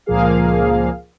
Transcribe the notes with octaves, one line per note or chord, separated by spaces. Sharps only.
C#2 A#2 F3 A#3 G#4 F5